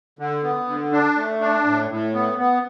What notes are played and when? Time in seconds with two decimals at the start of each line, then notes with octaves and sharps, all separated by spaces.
0.19 D3
0.43 B3
0.68 D3
0.92 D4
1.16 A3
1.41 D4
1.65 A2
1.89 A2
2.14 B3
2.38 B3